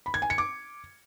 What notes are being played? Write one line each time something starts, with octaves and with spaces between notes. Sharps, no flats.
B5
G#6
G#5
C#7
D6